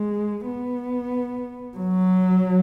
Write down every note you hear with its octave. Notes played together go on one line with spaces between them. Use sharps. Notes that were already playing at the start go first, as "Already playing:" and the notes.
Already playing: G#3
B3
F#3